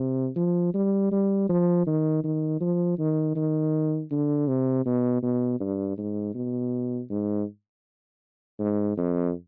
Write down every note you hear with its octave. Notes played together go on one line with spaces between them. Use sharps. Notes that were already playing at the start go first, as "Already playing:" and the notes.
Already playing: C3
F3
G3
G3
F3
D#3
D#3
F3
D#3
D#3
D3
C3
B2
B2
G2
G#2
B2
G#2
G#2
F2